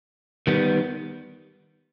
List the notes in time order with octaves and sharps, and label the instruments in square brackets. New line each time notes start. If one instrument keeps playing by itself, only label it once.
[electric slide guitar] D#3 G3 B3